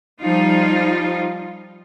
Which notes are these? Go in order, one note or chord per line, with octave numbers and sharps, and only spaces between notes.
F3 G3 D#4 F4